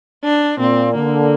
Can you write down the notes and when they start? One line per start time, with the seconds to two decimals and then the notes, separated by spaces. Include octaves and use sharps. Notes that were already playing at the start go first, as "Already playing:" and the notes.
0.24 D4
0.59 A#2 C4
0.94 D3 A#3